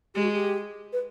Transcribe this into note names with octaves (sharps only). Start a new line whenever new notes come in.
G#3 G4
F#4
G4
B4